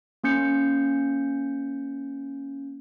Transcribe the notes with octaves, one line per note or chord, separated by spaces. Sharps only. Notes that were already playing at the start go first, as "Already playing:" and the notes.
A#3 C#4 G6 C#7